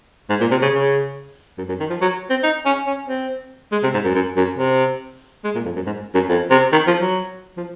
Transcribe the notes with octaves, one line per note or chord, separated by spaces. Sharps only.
G#2
A#2
C3
C#3
C#3
F#2
F#2
D#3
F3
F#3
C4
D#4
C#4
C#4
C4
G#3
C3
G#2
F#2
F#2
F#2
C3
G#3
A#2
F2
F#2
G#2
F#2
F2
C3
D#3
F3
F#3
F3